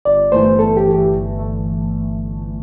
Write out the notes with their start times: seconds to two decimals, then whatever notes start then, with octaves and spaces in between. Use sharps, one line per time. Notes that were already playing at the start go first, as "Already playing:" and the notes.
0.05 G1 D5
0.32 G2 E3 A3 C5
0.59 G1 A4
0.77 G4
0.86 G2 E3 A3
0.94 G4
1.13 G1
1.39 A3